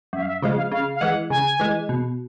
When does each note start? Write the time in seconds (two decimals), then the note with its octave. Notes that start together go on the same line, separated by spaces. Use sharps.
0.13 F#2 E5
0.22 F5
0.28 E5
0.42 C#3 F3 G#3 F5
0.57 F5
0.72 C#3 F5
0.95 F5
1.01 E3 G#3 F#5
1.30 C#3 G#5
1.60 E3 G#3
1.89 B2